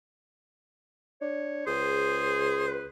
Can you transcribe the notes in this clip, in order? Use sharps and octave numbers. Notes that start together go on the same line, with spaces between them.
D4 C#5
C#2 G#4 C5
B4